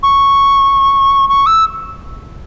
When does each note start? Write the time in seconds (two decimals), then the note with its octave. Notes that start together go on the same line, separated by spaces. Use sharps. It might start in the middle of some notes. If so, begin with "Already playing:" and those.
0.03 C#6
1.29 C#6
1.46 E6